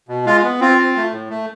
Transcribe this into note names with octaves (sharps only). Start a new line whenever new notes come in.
B2
G#3 F4
B3
C4 F4
C4
A3
A2
A3